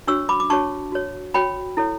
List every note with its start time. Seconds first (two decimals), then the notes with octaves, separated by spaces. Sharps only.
0.07 D4 F#4 C#5 C#6 E6
0.29 B5 D6
0.40 D6
0.50 D4 F#4 C#5 A5 C#6
0.92 F#4 C#5
1.34 F#4 C#5 G5 B5
1.77 E4 A4 C#5